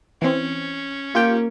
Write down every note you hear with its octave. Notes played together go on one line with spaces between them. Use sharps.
E3 C4 C#4
A#3 F4 G4 G5